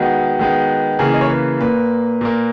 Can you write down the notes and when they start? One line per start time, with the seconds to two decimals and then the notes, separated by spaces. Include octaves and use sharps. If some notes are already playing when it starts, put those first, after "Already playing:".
Already playing: D#3 G#3 B3 F#4
0.39 D#3 G#3 B3
0.99 C#3 E3 A#3 G#4
1.14 D#5
1.21 C#5
1.29 B4
1.60 A#2 A#3 B4
2.21 A#2 A#3